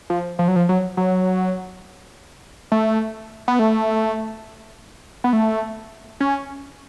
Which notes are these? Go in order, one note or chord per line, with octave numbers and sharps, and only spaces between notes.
F3
F3
F#3
F3
F#3
F#3
A3
B3
A3
B3
A3
C#4